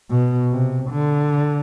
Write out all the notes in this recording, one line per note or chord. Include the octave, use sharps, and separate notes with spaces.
B2
C3
D3